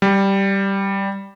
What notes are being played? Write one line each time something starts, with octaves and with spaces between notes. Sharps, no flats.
G3